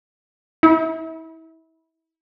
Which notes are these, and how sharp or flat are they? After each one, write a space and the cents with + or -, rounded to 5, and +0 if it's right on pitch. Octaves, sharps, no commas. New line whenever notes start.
E4 -30